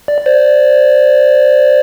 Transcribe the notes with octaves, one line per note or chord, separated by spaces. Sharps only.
D5
C5 D5